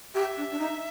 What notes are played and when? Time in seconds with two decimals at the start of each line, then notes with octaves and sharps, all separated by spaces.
0.14 G4 E5
0.37 D4
0.51 D4
0.58 D#4